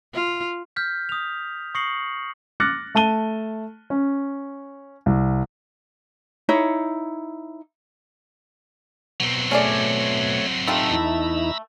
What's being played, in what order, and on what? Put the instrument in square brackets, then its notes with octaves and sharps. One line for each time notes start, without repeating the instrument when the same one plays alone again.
[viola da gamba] F4
[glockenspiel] F6 G6 B6
D#6 F7
C#6 D#6 A#6 C7 C#7 F#7
[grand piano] D6 F6 F#6 A6 A#6 C#7
A3 A5 D#7 G7
C#4
C2
[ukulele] D#4 E4 C#5
[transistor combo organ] B2 [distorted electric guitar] F#3 C4
[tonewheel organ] A3 C#5 [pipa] C#4 G#4 D5
[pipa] A3 F4 G4 [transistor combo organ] D#4 [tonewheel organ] A#5 B5 E6
[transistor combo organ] E2 D#4 E4